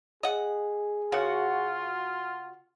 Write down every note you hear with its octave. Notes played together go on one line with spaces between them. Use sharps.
G#4 D#5 F#5
C#3 F4 F#4 F#5